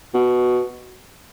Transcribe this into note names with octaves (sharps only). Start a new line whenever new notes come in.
B2